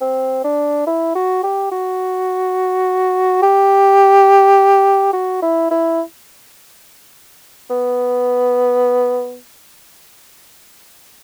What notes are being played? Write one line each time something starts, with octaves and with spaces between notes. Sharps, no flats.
C4
D4
E4
F#4
G4
F#4
G4
F#4
E4
E4
B3